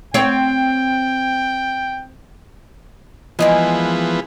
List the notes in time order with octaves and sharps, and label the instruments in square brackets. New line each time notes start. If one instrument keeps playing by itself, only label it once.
[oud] C4 C#5 [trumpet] G5
[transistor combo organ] E3 F3 B3 [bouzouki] G#3 A#3 G#4 [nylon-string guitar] D#5